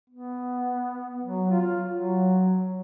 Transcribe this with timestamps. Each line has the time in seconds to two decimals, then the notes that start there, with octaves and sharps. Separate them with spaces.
0.10 B3
1.23 F#3
1.51 F4
1.92 F#3